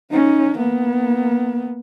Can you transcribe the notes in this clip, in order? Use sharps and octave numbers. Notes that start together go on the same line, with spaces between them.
C#4 D#4
A#3 B3